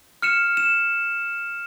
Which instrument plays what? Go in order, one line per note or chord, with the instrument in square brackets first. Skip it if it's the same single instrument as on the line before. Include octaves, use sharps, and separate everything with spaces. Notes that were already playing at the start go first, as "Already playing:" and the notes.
[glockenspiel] F6 C#7 E7
E7